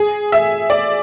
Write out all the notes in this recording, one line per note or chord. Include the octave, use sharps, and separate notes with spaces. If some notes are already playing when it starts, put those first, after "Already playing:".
Already playing: G#4
E5
D5